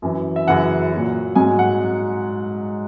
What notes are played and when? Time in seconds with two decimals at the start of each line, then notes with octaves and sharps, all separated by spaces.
0.02 F#2 E3
0.36 E5
0.47 F#2 C#3 E3 F#5
0.92 A#2 F#3
1.35 G#2 F#3 G#5
1.59 F#5